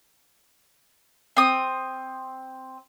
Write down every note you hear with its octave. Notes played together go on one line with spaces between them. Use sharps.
C4 D#6